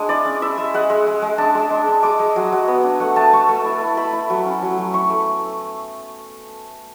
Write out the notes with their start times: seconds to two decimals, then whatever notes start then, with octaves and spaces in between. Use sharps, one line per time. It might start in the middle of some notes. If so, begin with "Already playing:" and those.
Already playing: G#3 D4 F#5 G#5
0.09 E4 D5
0.25 C#4
0.42 E4 E5
0.58 G#3
0.74 G#3 F#5
0.90 G#3
1.07 G#3
1.22 G#3
1.38 D4 A5
1.55 G#3
1.70 D4
1.87 D4
2.03 G#3 D6
2.19 G#3
2.36 F#3
2.52 F#3
2.68 B3
2.84 D4
3.00 A3 F#5
3.16 A3 A5
3.33 A3 C#6
3.49 A3
3.65 E4
3.81 E4
3.97 A3 B5
4.13 E4
4.30 F#3
4.45 C#4
4.62 F#3
4.78 F#3
4.94 E4 C#6
5.10 A3